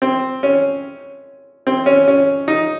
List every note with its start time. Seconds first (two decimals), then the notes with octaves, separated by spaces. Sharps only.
0.02 C4
0.43 C#4
1.67 C4
1.86 C#4
2.08 C#4
2.48 D#4